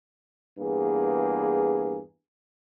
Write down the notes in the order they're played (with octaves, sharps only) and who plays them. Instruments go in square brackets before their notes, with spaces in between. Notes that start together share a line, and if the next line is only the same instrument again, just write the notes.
[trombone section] E2 G2 A#3 G#4